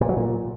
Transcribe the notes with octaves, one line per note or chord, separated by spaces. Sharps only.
A#2
F#3
A#2